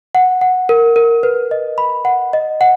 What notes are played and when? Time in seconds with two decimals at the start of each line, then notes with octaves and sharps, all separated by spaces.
0.15 F#5
0.41 F#5
0.69 A#4
0.96 A#4
1.23 B4
1.51 D#5
1.78 B5
2.05 F#5
2.33 D#5
2.61 F#5